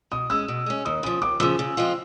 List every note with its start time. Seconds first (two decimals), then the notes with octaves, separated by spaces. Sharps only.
0.11 B2 D#6
0.30 G#3 C#4 E6
0.48 B2
0.66 G#3 C#4
0.85 D#2 D#6
1.03 C#3 F3 D#6
1.22 D#2 D6
1.40 C#3 F3 E6
1.59 C#3
1.77 F3 G#3 C4 F4